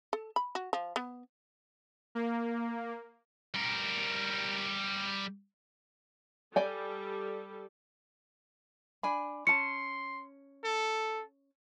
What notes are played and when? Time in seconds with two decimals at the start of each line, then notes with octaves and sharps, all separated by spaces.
0.13 A4
0.36 B5
0.55 F#4
0.73 F3
0.96 B3
2.15 A#3
3.54 G3 A#4
6.56 G3 A4 D5 G5 G#5
9.03 D4 G#5 B5
9.47 C#4 A5 C6 C#7
10.64 A4